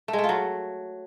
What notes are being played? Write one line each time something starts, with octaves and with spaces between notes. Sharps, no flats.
A3
G#3
A3
F4
F#3